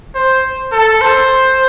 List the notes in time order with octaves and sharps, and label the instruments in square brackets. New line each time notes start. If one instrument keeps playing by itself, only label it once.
[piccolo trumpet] C5
A4
C5